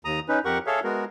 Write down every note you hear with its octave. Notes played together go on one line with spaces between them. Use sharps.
D#2 A#5 D#6
C#4 D#4 B4
F2 G4 A#4 F#5 C#6
G#4 A4 C#5 E5 F5
G#3 B3 F#4 A#4